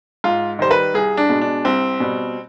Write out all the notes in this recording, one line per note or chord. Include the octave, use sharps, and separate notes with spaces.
G#2 F4
D#3 G3 C5
B4
C2 G#4
D4
B2 G#3
D4
C2 C4
B2 G3